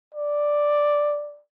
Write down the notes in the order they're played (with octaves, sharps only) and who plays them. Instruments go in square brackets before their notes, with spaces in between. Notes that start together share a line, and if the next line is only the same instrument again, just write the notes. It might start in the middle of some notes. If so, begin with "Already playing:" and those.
[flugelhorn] D5